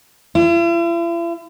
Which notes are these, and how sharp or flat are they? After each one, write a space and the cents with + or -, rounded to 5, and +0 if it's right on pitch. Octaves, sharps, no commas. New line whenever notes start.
E4 +45